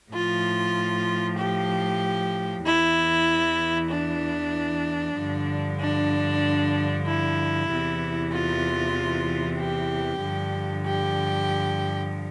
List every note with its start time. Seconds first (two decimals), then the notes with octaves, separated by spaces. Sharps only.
0.12 A2 F3 F4
1.38 G4
2.65 E2 E3 E4
3.90 D4
5.17 G2 D3 F3
5.80 D4
7.06 E4
7.69 E2 C3 E3
8.32 F4
9.58 G4
10.22 G2 D3 F3
10.84 G4